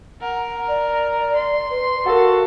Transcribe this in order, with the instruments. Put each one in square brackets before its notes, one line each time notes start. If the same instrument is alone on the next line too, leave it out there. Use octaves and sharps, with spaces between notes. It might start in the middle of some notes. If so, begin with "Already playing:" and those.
[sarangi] A#4 [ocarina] F#5
[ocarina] D5
[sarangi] C6
[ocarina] B4
[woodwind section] F#4 A4 [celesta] A#4 F#5 [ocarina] F5